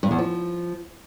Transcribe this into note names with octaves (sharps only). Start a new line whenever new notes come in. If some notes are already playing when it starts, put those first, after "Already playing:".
G2
E2
F3